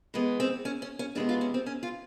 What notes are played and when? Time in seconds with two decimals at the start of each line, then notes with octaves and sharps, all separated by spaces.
0.14 E3 G#3 B3
0.40 C4
0.65 C#4
0.82 C#4
0.99 C#4
1.15 C3 E3 G#3 B3 D4
1.29 F4
1.41 C#4
1.54 C4
1.66 C#4
1.83 F4